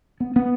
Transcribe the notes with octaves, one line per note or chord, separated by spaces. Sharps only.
B3
B3